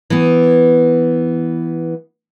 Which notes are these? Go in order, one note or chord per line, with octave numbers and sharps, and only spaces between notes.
E3 B3